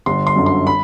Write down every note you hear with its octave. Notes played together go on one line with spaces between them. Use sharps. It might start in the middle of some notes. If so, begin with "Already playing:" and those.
G1 C6
C6
F#2 D3
C6
B5